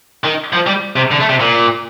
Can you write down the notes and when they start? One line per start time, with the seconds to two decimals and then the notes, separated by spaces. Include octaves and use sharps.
0.24 D#3
0.53 F3
0.67 G3
0.96 C3
1.11 D3
1.20 A3
1.30 C3
1.40 A#2